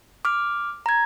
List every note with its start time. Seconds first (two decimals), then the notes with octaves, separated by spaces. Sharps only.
0.25 D6 F6
0.86 A#5 G#6